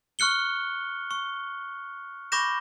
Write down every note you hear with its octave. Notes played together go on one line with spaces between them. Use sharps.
C#6 F6 F#6 C#7 G7
C#6
B5 C#6 D6 G6 A#6 E7